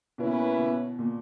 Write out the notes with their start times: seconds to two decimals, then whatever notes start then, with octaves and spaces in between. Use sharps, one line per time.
0.18 B2 A#3 C#4 E4 B4
0.58 B2
0.99 A#2